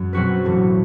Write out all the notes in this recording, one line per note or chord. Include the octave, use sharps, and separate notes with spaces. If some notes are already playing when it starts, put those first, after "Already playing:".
Already playing: F#2
B2 F#3 C4 F#4 B4
A1 A2 E3